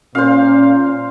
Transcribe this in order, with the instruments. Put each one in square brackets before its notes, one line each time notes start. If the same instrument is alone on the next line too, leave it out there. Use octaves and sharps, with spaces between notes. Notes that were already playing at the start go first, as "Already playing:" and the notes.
[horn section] A#2 [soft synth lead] C#4 [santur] C5 F5